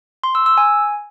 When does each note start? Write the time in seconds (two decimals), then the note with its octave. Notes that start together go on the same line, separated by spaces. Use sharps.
0.24 C6
0.35 E6
0.46 E6
0.58 G#5